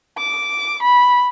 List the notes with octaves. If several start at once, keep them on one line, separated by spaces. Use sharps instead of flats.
D6
B5